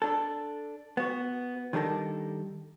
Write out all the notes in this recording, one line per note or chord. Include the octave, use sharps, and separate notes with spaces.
D4 A4
B3 F#4
D#3 G3 D4 A4 A#4